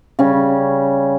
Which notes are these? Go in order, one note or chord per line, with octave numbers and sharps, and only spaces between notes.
C#3 G3 C#4